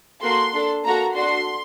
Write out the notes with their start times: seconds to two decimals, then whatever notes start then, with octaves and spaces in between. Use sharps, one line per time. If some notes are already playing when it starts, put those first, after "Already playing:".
0.22 A#3 F#4 A4 C6
0.53 D4 A4
0.84 A#3 F#4 A4 A#5
1.15 D4 F#4 A4 C6